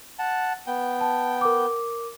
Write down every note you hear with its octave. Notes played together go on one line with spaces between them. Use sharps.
F#5 A5
B3 G5
A5
A#4 D6